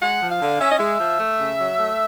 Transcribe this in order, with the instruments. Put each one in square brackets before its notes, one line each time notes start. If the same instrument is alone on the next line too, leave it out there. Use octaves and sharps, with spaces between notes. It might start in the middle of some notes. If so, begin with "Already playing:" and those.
[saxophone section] G#3 F#5
F3
F5
D3
C#4 E5
D#5
G#3 E5
F3
A3
C#3
F#3
A3